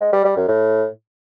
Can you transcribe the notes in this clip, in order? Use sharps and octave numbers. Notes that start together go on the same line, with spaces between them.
G#3
G3
G3
F#2
A2